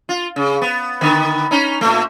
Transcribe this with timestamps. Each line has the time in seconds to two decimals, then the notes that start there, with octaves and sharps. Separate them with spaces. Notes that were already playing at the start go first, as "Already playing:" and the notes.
0.09 F4
0.36 C#3
0.62 B3
1.01 D3 D#3 B3
1.51 C#4 D#4
1.81 A#2 A3